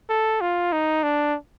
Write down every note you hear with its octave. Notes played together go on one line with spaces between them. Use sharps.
A4
F4
D#4
D4